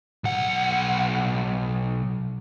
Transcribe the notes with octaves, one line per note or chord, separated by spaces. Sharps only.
B1 F#5